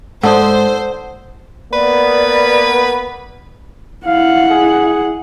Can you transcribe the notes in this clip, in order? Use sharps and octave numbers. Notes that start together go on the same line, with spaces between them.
G#2 A4 C5 D5 F#5 A5 D#6
A#3 B3 B4 D5
E4 F5 F#5
G#4